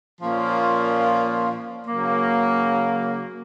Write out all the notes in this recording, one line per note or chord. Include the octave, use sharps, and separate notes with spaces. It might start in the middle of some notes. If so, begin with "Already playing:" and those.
A#2 F3 A#3 C#4 F4
C#3 F#3 A#3